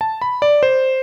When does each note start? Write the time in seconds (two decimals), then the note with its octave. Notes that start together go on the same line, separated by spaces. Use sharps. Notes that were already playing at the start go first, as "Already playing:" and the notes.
0.01 A5
0.21 B5
0.42 D5
0.63 C5